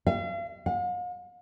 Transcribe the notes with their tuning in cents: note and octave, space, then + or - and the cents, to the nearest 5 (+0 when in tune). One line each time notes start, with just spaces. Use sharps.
F5 -40
F5 +45